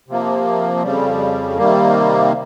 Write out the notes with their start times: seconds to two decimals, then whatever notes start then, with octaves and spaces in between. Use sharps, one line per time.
0.08 C3 F3 A#3
0.82 F2 C#3 G3
1.57 C3 D#3 G3 A#3